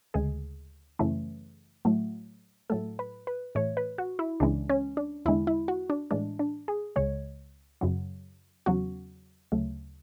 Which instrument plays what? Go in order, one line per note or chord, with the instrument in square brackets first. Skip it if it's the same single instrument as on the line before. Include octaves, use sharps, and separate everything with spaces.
[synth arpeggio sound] D2 C#3 G#3 G#4
F#2 C#3 E3 A3
A2 F#3 A3
A2 F#3 A3 A4
B4
B4
A2 E3 A3 C#5
B4
F#4
E4
C#2 C#3 E3 G#3 D4
C#4
D4
E2 D3 G#3 E4
E4
F#4
D4
A2 E3 G#3 D4
D4
G#4
C#2 C#3 G#3 C#5
F#2 C#3 F#3
E2 C#3 F#3 F#4
D2 C#3 F#3 A3